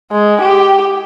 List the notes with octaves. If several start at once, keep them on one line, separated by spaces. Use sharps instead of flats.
G#3
G4